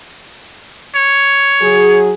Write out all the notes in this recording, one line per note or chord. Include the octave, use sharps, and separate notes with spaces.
C#5
F#3 G#4